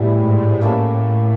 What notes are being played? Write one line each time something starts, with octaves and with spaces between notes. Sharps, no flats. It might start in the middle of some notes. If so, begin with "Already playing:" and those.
Already playing: A2 G3 B3 E4 G#4
G#2
A2 A#3 C#4 E4 A4